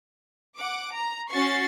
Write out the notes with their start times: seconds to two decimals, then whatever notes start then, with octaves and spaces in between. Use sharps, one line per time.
0.57 F#5 D6
0.95 A#5
1.30 C#4 F#4 C#6 A6 C7